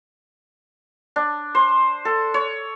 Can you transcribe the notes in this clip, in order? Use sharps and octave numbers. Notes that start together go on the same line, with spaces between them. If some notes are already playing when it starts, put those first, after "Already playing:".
D4
C5
A4
C#5